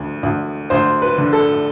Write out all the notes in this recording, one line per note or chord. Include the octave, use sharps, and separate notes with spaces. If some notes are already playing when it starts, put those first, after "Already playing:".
Already playing: D2
D2
D2 C5
B4
D3
A4